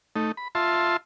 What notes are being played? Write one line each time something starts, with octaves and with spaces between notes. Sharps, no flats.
A3 D#4
B5
F4 E5 A5 C6